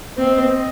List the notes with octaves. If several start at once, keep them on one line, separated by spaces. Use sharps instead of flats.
C4 D#5